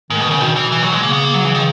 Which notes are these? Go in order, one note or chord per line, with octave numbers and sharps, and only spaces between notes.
G#2 D#3
B2
D#3
C#3
B2 D#3
E3
E3
F#3
G#3
C#3 A#3
B3
A#3
F#3
E3
D#3